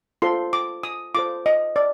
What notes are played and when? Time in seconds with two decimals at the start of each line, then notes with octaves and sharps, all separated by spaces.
0.22 F4 A4 C5 C6
0.53 D6
0.83 D#6
1.15 F4 A4 C5 D6
1.46 D#5
1.76 D5